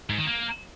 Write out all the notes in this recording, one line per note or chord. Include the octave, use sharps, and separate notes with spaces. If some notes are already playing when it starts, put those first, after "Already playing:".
G#2
D#3
A#3